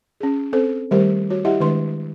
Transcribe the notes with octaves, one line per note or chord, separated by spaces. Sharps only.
C#4 G#4
C4 A4 C5
D#3 G3 A3 G4 A#4 C5
F#4 C#5
E4 G4 D#5 E5 F#5
D#3 G#3 D4 B4 C6